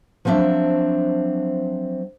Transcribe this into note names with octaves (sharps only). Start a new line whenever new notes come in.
F3 F#3 C4 D4 E5